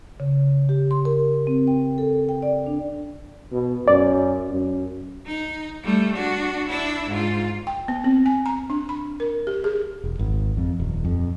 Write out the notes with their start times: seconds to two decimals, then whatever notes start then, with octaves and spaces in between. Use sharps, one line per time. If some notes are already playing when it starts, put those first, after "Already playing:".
0.20 C#3
0.69 G4
0.91 C6
1.05 A#4
1.47 C4
1.67 G5
1.98 A4
2.29 G5
2.42 D5
2.66 D4
3.52 B2
3.88 F#2 D5
4.51 F#2
5.27 D#4
5.83 G3 A3
6.16 D4 F#4
6.69 D4 E4
7.09 G#2 F4
7.67 G5
7.88 B3
8.04 C4
8.26 G#5
8.46 A#5
8.70 D4
8.89 B5
9.20 A#4
9.47 G4
9.64 G#4
10.04 E1
10.19 G#1
10.57 F2
10.80 D#1
11.05 F2